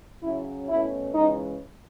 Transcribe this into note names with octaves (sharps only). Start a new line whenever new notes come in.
C#3 F#3 C#4 E4
B2 A3 C#4 E4
C#3 E3 G#3 D#4